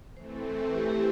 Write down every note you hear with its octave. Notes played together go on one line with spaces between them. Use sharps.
E3 A3 C4 C5
A4
A4
G4
G4
E4